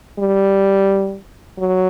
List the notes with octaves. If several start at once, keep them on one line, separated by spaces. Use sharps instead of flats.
G3
F#3